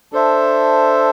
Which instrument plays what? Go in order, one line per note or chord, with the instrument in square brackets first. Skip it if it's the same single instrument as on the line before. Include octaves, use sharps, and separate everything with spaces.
[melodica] D4 A4 C5 E5